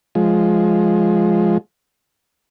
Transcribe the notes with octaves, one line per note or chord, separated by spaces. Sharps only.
F3 G#3